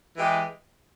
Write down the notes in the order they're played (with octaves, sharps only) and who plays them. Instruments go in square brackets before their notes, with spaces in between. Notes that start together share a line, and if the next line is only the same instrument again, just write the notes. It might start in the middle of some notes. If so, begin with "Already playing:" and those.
[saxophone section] E3 G#3 E4 G4